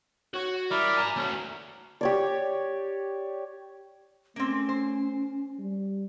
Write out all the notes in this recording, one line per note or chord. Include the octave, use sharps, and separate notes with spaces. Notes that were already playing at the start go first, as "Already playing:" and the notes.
F#4 C#5
G3 E4 A#4 D5
G#5 A#5
A3 C#4 F#4
G4 C#5 D5
A3 A#3 C4 C#4
C5
G3